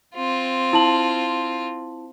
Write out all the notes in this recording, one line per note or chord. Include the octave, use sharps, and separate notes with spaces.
C4 F4
E4 A5 F#7